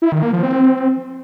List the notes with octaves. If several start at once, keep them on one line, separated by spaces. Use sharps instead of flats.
E4
D#3
A#3
F3
C4